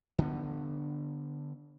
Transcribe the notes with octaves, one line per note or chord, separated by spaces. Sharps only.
D3 B3